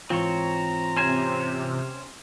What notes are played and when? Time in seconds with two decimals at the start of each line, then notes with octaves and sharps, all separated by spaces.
0.10 G#2 E3 C4 F4 C#5 A#5
0.97 C3 C#4 C5 G#5